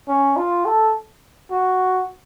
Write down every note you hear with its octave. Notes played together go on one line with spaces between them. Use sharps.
C#4
F4
A4
F#4